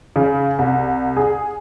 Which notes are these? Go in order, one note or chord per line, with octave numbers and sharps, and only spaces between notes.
C#3
C2
G#4